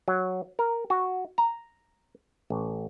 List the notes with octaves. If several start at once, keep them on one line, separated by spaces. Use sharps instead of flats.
F#3
A#4
F#4
A#5
A1